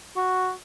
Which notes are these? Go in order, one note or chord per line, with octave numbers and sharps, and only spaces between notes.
F#4